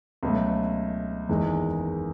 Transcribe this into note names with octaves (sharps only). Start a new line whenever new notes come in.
C#2 B2 F#3 A3
F#1 E2 D#3 G#3 D#4